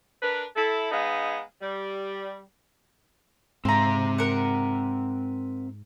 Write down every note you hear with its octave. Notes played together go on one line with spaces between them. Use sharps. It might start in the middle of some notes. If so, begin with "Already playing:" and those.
D4 A#4 B4
E4 A4
G#3 B3 D#4 F5
G3
G#2 C4 E5 F5 A#5
A#4 F#5